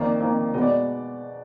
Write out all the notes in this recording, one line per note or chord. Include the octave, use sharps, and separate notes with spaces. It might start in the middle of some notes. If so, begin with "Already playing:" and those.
Already playing: F2 D#3 A#3 D5
F2 D#3 A#3
B2 G#3 B3 D#5
D5